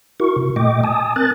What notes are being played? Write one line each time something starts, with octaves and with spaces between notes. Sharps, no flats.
E4 F#4 A#4 C#6
C3
A#2 A3 D#5 G5 D6
G#5 A5 D#6
C4 A#4 F#6 A6